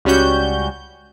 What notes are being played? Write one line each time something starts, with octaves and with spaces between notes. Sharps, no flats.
C#2 G3 C#4 F#4 G6